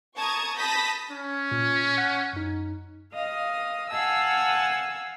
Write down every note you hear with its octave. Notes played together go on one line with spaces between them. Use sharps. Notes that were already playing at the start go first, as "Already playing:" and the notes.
A5 A#5 C#6 D#6 G#6
A5 B5 D#6 G6 A#6 B6
C#4
A#2
F#5 F#6 G#6
F#2 D#4
D#5 F5 D#6
F5 F#5 G#5 A5 E6